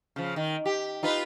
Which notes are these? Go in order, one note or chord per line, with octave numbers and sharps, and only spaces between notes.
C#3 F3
D#3
G4
D#4 F4 B4